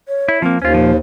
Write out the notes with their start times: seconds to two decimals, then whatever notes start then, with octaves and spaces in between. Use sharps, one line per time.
0.08 C#5
0.28 E4
0.42 F3 A#3 C4
0.62 D#2 C#4 F4 C5
0.74 A#2 F3